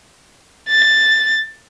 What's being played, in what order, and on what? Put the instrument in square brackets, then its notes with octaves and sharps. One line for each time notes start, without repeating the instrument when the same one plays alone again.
[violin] A6